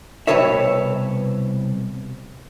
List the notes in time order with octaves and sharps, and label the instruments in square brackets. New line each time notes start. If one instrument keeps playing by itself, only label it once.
[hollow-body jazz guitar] C2 G2 B2 B4 C#5 E5